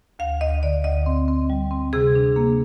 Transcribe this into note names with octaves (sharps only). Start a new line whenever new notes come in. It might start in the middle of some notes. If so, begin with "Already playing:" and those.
D2 F5
D2 D#5
D3 D5
D2 D#5
C4
C4
G3
C4
C3 G#4
D4
A#3